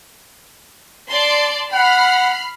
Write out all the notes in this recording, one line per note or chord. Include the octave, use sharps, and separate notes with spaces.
D5 A5 C6
F#5 B5 F6 C7